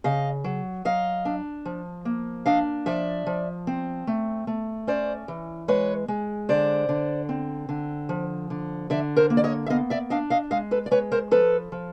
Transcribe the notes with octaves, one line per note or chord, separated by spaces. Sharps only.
C#3 D#5 F5
F#3
F#3 D#5 F5
D4
F3
A#3
D4 D#5 F5
F3 D5 E5
F3
C4
A3
A3
C#4 C5 D5
E3
G#3 B4 C#5
G#3
D3 C5 D5
D3
C4
D3
F3
D3
D3 D5 E5
A#4 C5
A#3
D5
C#5 D#5
E5
B3 D#5 F5
D5 E5
D4 D#5 F5
D#5 F5
G#3 D#5 F5
A4 B4
D5
G#3 B4 C#5
A#4 C5
F3 A4 B4
F3